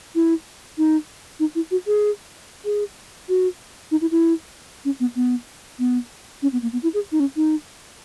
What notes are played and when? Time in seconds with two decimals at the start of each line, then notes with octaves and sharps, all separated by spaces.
0.15 E4
0.78 D#4
1.40 D#4
1.55 E4
1.71 F#4
1.87 G#4
2.65 G#4
3.29 F#4
3.91 D#4
4.01 E4
4.11 E4
4.85 C#4
5.00 B3
5.16 B3
5.79 B3
6.42 C#4
6.53 B3
6.62 A#3
6.73 B3
6.83 E4
6.94 G#4
7.12 D#4
7.20 C#4
7.36 D#4